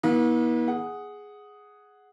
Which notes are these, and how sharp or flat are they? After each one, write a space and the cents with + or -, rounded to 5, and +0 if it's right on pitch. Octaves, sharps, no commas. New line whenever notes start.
E3 -45 B3 -45
G#4 +0 F#5 +0